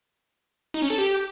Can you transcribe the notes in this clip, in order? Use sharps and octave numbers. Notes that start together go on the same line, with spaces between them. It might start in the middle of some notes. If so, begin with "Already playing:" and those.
D#4
C#4
A4
G4